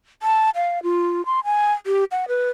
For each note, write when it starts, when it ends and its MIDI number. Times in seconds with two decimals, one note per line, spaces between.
0.22 0.50 81
0.56 0.83 77
0.83 1.24 65
1.26 1.40 84
1.44 1.72 80
1.86 2.04 67
2.11 2.25 78
2.28 2.50 71